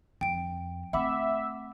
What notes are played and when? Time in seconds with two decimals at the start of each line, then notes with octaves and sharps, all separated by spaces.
0.21 F2 G5 D7
0.93 A3 C4 E5 F#5 B5 D6